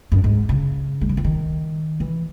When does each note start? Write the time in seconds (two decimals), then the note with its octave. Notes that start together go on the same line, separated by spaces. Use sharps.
0.12 F#2
0.24 G#2
0.49 C#3
1.01 G#3
1.09 F#3
1.17 E3
1.24 D#3
2.00 E3